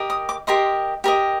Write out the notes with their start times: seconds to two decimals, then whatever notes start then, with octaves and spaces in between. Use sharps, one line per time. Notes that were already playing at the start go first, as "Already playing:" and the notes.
Already playing: G4 A#4 D#5
0.10 D#6
0.29 D6
0.47 G4 A#4 D#5 C6
1.04 G4 A#4 D#5